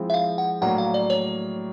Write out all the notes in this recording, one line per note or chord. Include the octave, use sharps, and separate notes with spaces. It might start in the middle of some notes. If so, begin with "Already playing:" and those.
Already playing: F3 G#3 C4 E4
E5
F5
F#5
A2 F#3 A#3 D4 F#5
F5
D5
C#5